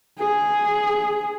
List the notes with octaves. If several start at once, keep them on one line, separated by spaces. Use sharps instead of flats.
G#4